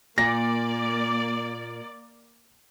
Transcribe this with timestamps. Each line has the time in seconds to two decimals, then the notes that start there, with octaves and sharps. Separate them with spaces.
0.18 A#2 A#3 D5 A#6